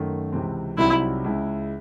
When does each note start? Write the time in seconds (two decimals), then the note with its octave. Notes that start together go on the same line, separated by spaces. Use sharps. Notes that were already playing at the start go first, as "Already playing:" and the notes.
Already playing: F#2 D#3 A3
0.32 C#2 C3 E3 C4
0.78 C2 C3 F#3 C4 D#4 E4
1.24 C#2 C#3 G#3 C#4 E4